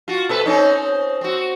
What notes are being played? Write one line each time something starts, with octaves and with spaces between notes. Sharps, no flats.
F4 F#4
B2 A4 B4
C4 C#4 D#4
C4 F#4